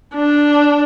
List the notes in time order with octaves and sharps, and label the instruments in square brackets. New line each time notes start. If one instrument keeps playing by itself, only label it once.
[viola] D4